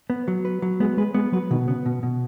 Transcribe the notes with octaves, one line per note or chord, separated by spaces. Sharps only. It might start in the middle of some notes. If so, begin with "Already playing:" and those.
B3
F#3
B4
F#3
G#3 B3
G#3 B4
G#3 B3
F#3 B4
B2 D#3
C#3 B3
B2
B2